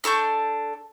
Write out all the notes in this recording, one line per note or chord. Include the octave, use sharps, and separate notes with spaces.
D4 A4 C#6 G6